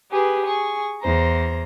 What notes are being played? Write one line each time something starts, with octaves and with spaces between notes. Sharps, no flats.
G4 G#4 B4
G#4 C#6
E2 C5 A#5